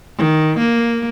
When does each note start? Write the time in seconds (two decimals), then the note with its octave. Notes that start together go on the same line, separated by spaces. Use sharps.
0.18 D#3
0.58 A#3